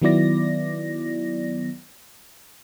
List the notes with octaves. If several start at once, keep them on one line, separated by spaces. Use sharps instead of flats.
D#3 F#3 B3 E4 D5 A#6